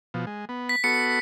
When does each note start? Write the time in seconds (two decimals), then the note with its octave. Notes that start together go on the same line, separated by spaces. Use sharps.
0.14 B2 F3
0.27 G#3
0.49 B3
0.69 B6
0.84 B3 F#4 A4 C#7